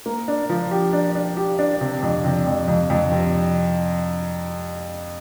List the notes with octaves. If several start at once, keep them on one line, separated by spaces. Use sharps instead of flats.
A#3
D4
F3
G4
D4
D4
G4
D4
C3
F2
C3
F2
F2
F2
C3